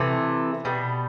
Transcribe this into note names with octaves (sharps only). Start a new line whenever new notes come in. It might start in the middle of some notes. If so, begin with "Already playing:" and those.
Already playing: C3 E3 A3
B2 G3